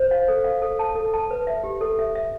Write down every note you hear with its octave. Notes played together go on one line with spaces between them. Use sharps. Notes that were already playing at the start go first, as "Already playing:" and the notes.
Already playing: C5
F5
A4
F5
A4
A5
A4
A5
B4
E5
G4
A4
E5
E5